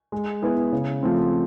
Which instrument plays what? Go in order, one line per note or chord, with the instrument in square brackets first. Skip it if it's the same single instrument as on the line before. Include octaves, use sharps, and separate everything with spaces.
[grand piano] G#3
B3 E4 G#4
C#3
F3 A3 C4